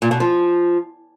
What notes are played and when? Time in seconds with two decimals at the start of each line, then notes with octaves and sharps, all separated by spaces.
0.02 A#2
0.11 B2
0.20 F3